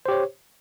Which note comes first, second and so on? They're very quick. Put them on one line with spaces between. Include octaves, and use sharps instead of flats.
C5 G4 C#5